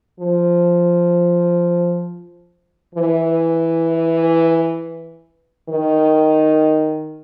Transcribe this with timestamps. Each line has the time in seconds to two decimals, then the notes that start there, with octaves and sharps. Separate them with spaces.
0.20 F3
2.95 E3
5.69 D#3